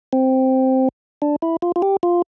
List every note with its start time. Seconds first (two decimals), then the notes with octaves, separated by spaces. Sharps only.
0.13 C4
1.22 D4
1.42 E4
1.62 F4
1.76 F4
1.82 G4
2.03 F4